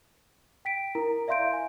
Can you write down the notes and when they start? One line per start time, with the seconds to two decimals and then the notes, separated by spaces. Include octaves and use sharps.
0.65 G5 B6 D7
0.95 E4 A#4 A#5
1.28 D5 E5 F5 C6 G6 D7
1.53 G#5